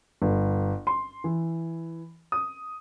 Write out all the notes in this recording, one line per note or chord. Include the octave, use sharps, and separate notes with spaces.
G1
C6
E3
D#6